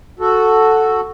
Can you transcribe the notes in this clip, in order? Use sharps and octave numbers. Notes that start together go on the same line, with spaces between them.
F#4 A4